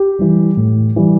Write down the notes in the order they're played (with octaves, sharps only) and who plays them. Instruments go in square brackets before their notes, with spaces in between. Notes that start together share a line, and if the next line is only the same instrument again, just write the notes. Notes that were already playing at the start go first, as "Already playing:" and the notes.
Already playing: [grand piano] G4
E3 G3
A2
E3 G3